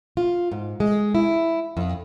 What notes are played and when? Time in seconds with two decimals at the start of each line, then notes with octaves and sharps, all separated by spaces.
0.17 F4
0.51 G#2
0.80 G#3
1.15 E4
1.77 F2